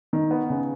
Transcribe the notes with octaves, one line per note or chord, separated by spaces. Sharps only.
D#3
B3
C#3